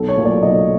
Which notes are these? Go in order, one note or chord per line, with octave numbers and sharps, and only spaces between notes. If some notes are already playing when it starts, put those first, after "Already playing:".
Already playing: B1 A4
C#5
A#2 F#3 A3
D5
B1 D#5